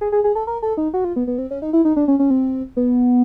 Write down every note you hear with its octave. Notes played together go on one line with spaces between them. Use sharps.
G#4
G#4
G#4
A4
A#4
A4
D#4
F#4
F4
B3
B3
C4
C#4
D#4
E4
D#4
D4
C#4
C#4
C4
B3